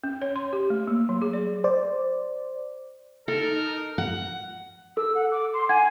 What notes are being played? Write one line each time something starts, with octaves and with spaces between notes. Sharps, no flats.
C#4
C#5
C6
G4
A3
A#3
F#3
G#4
D5
C5 D5
D#4 A4 A#4
F#5
A4 E6
F#5
D6
C6
F#5 G#5 G#6